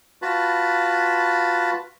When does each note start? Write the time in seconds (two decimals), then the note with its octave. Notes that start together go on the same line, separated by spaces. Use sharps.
0.22 F4 F#4 B4 A5 B5